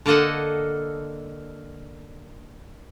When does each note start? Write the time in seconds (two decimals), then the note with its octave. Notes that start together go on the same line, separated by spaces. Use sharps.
0.06 D3 A#3 A4 D#5 F#5